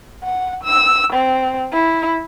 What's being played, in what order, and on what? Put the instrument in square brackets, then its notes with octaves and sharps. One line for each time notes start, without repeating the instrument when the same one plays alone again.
[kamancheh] F#5
E6
C4
E4